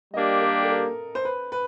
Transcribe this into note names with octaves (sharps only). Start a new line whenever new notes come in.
G3 A#3 D4 G4 D#5
A#4
A4
A#4
C5
B4
B4